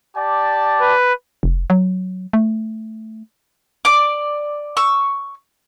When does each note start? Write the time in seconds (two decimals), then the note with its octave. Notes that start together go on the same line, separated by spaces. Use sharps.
0.15 G4 D5 A5
0.81 B4
1.43 F1
1.70 F#3
2.33 A3
3.85 D5 D6
4.77 C#6 E6